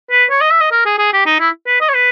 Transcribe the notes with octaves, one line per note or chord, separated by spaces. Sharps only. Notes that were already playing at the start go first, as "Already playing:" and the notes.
B4
C#5
D#5
E5
D#5
A#4
G#4
G#4
G4
D#4
E4
B4
D#5
C#5
B4